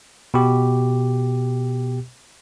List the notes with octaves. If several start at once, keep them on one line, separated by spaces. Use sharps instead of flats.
B2 G4